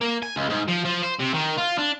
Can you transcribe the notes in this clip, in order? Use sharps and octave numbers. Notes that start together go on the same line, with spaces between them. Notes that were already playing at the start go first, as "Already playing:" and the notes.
A#3
G#5
C#2
G#2
F3
F3
C5
C3
D#3
F4
D4